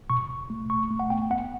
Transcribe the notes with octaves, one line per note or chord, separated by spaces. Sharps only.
B2 C#6
B2
A3
B2 C#6
A3
F#5
B3 G5
B3 F#5